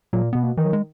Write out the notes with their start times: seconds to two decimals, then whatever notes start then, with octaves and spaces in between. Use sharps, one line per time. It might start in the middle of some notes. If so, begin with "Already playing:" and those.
0.13 A#2 F#3
0.33 B2 B3
0.43 A#3
0.57 D#3 E3
0.65 F#3
0.73 G#3